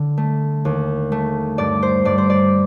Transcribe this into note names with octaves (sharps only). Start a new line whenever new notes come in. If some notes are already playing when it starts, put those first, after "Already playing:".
Already playing: D3
A3
D#2
A3
G2 D5
C5
G2 D5
C5
D5